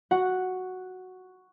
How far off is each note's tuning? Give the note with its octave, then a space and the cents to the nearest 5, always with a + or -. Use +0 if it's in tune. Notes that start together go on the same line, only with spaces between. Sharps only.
F#4 +0 F#5 +0